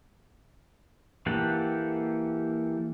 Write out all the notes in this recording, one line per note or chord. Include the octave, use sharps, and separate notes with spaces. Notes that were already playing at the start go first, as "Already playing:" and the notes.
E3 A#3 G4 A4 F#5